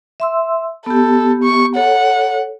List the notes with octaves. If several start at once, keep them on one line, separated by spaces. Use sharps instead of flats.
E5 C6 E6
B3 G4 A4
C#6
A4 C#5 F#5